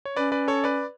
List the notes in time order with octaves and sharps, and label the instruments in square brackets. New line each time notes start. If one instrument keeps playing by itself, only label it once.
[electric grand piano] C#5
[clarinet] C#4 [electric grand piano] B4 D5
[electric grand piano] B4 D5
A4 C#5
B4 D5